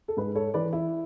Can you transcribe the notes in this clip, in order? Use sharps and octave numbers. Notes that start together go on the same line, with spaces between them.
A4
G#2 G#4 B4
A4 C#5
E3 B4 D5
E4